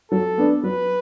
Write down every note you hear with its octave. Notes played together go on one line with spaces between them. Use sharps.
F#3 A4
B3 D4
F#3 B4